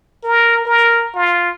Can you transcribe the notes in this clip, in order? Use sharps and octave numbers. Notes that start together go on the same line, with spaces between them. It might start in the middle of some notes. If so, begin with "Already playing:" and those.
A#4
A#4
F4